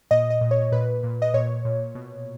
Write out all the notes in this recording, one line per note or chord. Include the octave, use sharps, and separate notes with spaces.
A#2 D#5
D#5
A#2
C#5
A#2 B4
A#2
D#5
A#2 C#5
A#2
B2